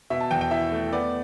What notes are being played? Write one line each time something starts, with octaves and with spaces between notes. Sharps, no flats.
B2 E5
A5
E2 G5
G5
E4 E5
A3
B3 D5